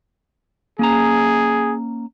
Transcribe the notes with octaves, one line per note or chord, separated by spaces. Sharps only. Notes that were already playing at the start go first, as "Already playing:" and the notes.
A#3 C#4 G#4 A#5